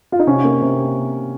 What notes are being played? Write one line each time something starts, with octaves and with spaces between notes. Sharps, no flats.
F4
D#4
C3 C#4
A#3
C3